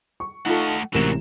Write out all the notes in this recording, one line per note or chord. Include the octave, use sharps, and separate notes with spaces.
C#6
A3 D#4 F4 A4 F#5
A1 G#2 C3 F#3 A#4 E7